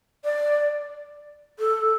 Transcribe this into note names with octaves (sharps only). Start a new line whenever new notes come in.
D5
A4